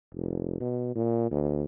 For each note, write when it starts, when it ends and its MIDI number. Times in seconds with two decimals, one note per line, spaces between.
0.14 0.56 29
0.60 0.92 47
0.95 1.28 46
1.31 1.65 38